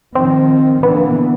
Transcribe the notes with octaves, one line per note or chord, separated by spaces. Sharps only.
D#3 F3 C4
D3 E3 B3
A#3
B3